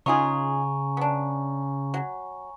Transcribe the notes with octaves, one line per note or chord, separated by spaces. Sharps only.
C#3 D#4 F4 G#4 G#5 A#5 C#6
B3 D4
F#3